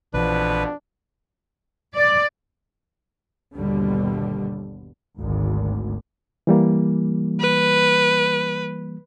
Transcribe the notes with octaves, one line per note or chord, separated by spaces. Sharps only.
A#1 F2 B2 E3 F3 D4 B4
D5
G1 D#2 B2 D3 G3
G#1 D2
E3 G3 A#3
B4